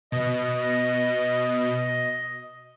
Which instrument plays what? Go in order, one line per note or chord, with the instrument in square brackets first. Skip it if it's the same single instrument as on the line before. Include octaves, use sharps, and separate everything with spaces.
[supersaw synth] B2 [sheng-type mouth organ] D#5